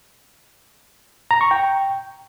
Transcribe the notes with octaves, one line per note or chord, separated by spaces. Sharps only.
A#5
C#6
G5